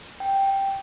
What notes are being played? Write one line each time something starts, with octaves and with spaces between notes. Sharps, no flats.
G5